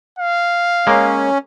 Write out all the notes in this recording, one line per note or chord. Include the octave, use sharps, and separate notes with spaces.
F5
G#3 A#3 C#4